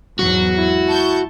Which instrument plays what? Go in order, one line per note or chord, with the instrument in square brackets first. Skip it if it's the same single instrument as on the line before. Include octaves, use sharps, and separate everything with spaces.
[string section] E2 G#2 F#3 [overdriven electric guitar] F#4
[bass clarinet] E4
[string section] A5 C#6 G6